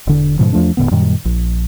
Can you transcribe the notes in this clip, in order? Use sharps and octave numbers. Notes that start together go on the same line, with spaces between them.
E1 D3
G#2 B2 D3 F3
E2 F3 A3 D4
E1 A2 D3 B3
F#2 A#2 D#3 G3
A#1